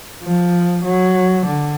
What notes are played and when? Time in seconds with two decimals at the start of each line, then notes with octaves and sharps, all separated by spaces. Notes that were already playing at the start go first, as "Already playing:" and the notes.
0.23 F3
0.85 F#3
1.46 D3